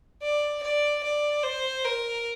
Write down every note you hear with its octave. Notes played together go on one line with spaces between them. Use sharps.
D5
D5
D5
C5
A#4